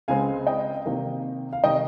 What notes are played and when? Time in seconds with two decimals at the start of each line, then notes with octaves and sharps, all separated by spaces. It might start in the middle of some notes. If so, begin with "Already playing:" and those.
0.08 C#2 C#3 G#3 C4 F5 G#5
0.47 D#5 G5
0.86 C3 D#3 A#3
1.53 F5
1.64 C3 D#3 D#5 G5